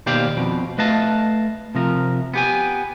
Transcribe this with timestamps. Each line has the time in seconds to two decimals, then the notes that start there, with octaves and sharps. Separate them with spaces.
0.06 D#2 B2 G4 C5 D5 F5
0.37 F2 B2
0.78 A3 B4 D#5 F5 A5
1.75 C3 F3 A#4
2.34 B3 G4 G#5